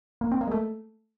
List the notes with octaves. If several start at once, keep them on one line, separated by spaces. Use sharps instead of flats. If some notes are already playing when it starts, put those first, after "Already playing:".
A#3
C4
A#3
G#3
A3